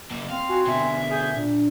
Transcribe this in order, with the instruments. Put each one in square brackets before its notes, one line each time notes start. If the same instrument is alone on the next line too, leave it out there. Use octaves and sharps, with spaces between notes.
[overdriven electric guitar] F#3 A#3
[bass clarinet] C4 [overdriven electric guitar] F5
[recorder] F#4 [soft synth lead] G#5
[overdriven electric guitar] B2 D3 [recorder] E5
[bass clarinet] G#4 [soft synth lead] G6
[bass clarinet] A#2 [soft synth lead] D4